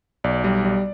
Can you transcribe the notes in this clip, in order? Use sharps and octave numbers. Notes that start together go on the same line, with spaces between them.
B1 D5
G3
G3